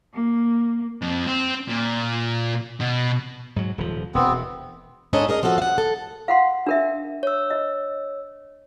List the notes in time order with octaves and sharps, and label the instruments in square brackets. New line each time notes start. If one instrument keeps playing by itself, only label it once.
[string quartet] A#3
[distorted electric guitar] F2
C4
A#2
B2
[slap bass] G#2 F#3
D#1 F3
[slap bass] E1 [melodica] B3 C4
[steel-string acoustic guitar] G#2 C#4 D4 A4 D#5
G#4 A#4 D#5
F3 F#4 A4 F5 F#5
F5 F#5
A4
[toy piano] F5 F#5 C6
D4 A#4 E5
[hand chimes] C#5 E6
[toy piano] D#5